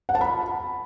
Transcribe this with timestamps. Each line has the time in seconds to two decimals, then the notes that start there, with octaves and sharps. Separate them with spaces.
0.09 F#5
0.15 A5
0.21 B5